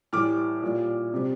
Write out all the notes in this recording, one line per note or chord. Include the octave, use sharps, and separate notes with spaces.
A2 E3 G3 D6 F6
A#2 G3
C3 G3